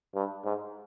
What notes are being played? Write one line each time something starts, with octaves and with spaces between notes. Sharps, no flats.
G2
G#2